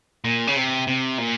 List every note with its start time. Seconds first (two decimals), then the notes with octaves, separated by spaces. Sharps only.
0.25 A#2
0.47 C#3
0.56 C3
0.87 C3
1.18 A#2